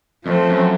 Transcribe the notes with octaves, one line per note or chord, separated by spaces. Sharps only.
F2 F3 A3 C4
F#2